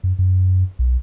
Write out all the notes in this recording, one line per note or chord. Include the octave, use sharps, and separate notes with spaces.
F#2
F#2
B1